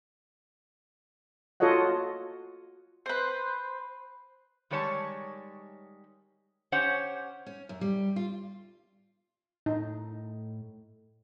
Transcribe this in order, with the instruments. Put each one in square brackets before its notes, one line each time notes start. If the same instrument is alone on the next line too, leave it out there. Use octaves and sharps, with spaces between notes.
[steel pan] F4 F#4 A4 C#5 D#5 F#5
[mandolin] B4 C5
[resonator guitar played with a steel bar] D#3 G3 G#3 C#5 A5
C#4 G4 C5 C#5 F#5
[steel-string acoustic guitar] C#4
F#2
G3
F4
[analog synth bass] A2 [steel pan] D#4